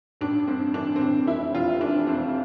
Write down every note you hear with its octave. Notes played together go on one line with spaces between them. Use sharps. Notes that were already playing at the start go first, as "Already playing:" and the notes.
A1 D4
G2 C4
E3 D4
C4
A1 D4
F1 E4
F1 F4
E3 D4
F2 C4